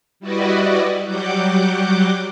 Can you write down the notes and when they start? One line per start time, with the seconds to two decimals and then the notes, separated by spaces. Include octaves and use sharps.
0.20 G3 E4 F#4 B4 D5 D#5
1.04 F#3 G3 F#5 D6 G6